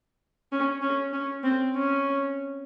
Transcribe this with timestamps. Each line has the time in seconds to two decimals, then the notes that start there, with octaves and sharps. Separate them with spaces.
0.52 C#4
0.82 C#4
1.13 C#4
1.44 C4
1.76 C#4